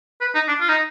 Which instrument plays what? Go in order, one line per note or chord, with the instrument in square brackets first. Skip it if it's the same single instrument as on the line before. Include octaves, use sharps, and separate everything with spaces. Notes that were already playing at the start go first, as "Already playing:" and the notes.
[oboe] B4
D#4
D4
F4
D#4